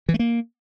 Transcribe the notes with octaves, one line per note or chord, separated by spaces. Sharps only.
E3
A3
A#3